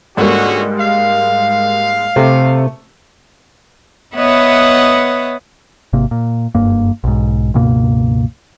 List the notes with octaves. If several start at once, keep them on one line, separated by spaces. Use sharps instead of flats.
G#2 D3 G3 A#3 C#4 F#4
F5
C3 A3
B3 B4 C#5 D#5 E5 F#5
G#1 C3 A#3
A#2
F#1 G2 A#3
B1 G#2
C#2 G2 B2 A#3